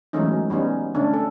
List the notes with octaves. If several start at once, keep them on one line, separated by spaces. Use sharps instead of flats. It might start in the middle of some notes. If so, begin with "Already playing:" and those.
E3 F#3 G#3 A3 C#4 D#4
G3 B3 C#4 D#4
D3 A3 C#4 D4
A4